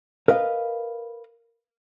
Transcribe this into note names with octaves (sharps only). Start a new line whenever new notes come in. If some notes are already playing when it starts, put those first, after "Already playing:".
A#4 B4 D#5 F5